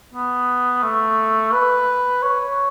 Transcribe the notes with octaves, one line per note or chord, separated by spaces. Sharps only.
B3
A3
B4
C#5